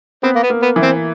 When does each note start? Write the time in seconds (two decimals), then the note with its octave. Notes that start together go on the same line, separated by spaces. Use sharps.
0.23 B3 C4
0.36 A#3
0.43 B3
0.50 A#3
0.62 B3
0.76 E3
0.83 C4